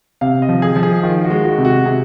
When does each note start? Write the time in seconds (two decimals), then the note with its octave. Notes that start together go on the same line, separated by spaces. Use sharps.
0.21 C3 F5
0.42 D#5
0.49 F3
0.62 G#4
0.76 F3
0.83 G#4
1.03 D#3 F4
1.24 F#4
1.30 G#3
1.44 F#4
1.58 C3
1.65 F#4
1.85 C3 G#4